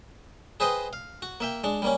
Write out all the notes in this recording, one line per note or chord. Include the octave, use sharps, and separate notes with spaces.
G#4 B4 C5 D#5 G5
F5
F#4
A#3 E5 G5
G#3 D4
G3 A#3 C#4